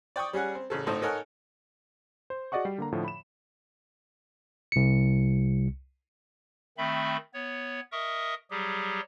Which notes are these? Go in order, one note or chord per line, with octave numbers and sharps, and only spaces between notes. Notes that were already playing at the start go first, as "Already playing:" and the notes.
D5 G5 C#6 D#6
G3 C#4 G#4 F#5
C4
A1 C#3 A4
G#1 A2 D#4 A4 C5
D#4 A4 A#4 C#5 F#5 G#5
C5
F#4 G#4 D5 D#5 F#5 C#6
G3 G5 C7
D3 A#3 A#5
A2 D3 F3
B5 E7
C2 C#7
D#3 A3 C4 E5 B5
B3 C#5
A#4 D#5 E5 C#6 D#6
F#3 G3 G4 G#4